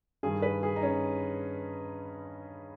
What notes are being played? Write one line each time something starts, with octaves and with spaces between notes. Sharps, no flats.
G2 D#3 G#4
B4
G#4
D#4
C#4